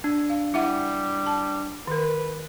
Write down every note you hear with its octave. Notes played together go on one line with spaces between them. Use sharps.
D4
F5
G3 E4 E5 F#5
A5
D#3 A#4 B4